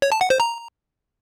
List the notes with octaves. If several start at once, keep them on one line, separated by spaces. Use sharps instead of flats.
C#5
A5
F#5
C5
A#5